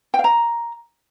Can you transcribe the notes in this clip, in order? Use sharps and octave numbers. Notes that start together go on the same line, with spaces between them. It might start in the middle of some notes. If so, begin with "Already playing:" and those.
G5
F5
A#5